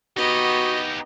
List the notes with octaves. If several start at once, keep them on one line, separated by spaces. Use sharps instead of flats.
B3 D#4 F#4 G4 D#5